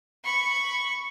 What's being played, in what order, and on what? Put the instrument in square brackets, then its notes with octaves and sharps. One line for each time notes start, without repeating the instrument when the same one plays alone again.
[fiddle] B5 C#6